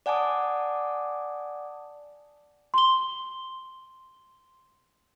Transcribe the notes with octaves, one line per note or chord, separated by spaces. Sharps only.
D5 F#5 G#5 A5 D6 D#6
C6 G7